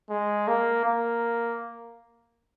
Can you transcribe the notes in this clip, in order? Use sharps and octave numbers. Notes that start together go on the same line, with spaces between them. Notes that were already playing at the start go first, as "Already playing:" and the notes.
G#3
A#3
A#3